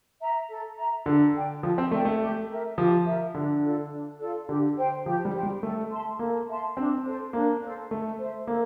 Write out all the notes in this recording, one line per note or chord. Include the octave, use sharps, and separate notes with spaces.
E5 A#5
A4
E5 A#5
D3 A4
D5 G5
F3 A4
C4
A3 D5 G5
A3
G4
A#4 E5
F3 G4
A#4 E5
D3 D4
F4 A4 D5
D4
F4 A4 D5
D3 G4
C5 G5
F3 G4
G3
C5 G5
G3
A3 A4
E5 A5 C6
A#3 A4
E5 A5 C6
C4 D4
A4 C5
A#3 D4
A4 C5
A3 A4
C5 E5
A#3 A4